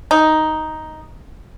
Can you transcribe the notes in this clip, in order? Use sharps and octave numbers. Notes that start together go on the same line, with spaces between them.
D#4